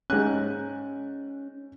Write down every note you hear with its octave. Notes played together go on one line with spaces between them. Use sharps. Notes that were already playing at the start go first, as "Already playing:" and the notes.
G#2 C#4 F#6